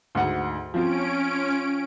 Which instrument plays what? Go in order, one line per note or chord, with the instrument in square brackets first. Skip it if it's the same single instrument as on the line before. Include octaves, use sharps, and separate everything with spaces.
[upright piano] D2 G#2 F#5
[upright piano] F3 C4 F4 [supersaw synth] C#4 D7